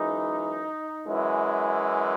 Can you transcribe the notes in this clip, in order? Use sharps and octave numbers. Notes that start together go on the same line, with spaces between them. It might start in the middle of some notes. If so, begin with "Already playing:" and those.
Already playing: F#2 E3 G#3 D#4
F#2 E3 G#3 E4